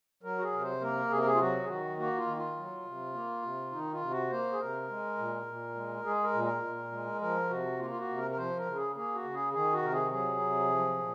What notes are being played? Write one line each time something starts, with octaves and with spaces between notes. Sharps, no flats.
F#3 A#4
F#4
G#4
C3 A#4
C5
A#3 A#4
C3 G#4
A#4
G#4
F4
F#3 F#4
G#4
D#3 F#4
A#3 F#4
F4
D#3
F4
F#3
C3
A#3
C3
D#3 D#4
F4
C3
F#4
A#3 C5
G#4
C3 A#4
G#3
A#2
A#2
G#3
G#3 G#4
A#4
A#2
A#4
A#2
G#3
F3 A#4
C3 F#4
A#3 F4
F4
F#4
C3
A#4
A#4
F3 C5
A#4
C#3
G#4
A#3 G#4
F#4
C#3
G#4
D#3 G#4
F#4
C3 A#4
G#4
F#3 G#4
C3
F3
A#2